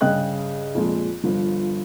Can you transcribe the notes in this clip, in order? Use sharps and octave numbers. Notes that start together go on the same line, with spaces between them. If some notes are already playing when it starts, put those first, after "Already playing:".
G2 C#3 G#4 D#5 G5 F#6
F2 A#2 G#3
G1 F3